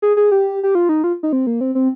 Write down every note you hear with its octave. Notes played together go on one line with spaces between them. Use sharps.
G#4
G#4
G4
G4
F4
D#4
F4
D#4
C4
A#3
C4
C4